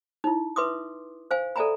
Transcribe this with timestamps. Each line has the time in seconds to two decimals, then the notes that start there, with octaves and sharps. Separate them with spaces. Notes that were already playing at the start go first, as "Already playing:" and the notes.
0.24 D#4 E4
0.56 B4 E5 C6 D6 D#6
1.31 C5 F5 G#5
1.56 A4 D5 E5 G#5 A#5 B5